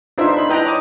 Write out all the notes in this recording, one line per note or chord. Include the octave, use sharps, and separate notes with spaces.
D4 D#4 F4 B4 C5 E5
D#4 B5
E4 B4 D#5 G5 A5 A#5
C#5 D6 D#6